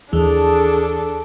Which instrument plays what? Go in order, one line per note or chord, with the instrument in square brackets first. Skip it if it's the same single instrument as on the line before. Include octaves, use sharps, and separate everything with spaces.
[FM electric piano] D#2 E3 [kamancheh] D4 A4 [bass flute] G#4